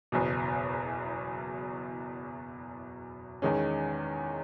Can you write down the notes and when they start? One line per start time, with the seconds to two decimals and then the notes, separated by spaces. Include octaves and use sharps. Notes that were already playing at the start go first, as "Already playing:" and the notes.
0.12 F#1 E2 B2
3.42 E2 D#3 G#3 C#4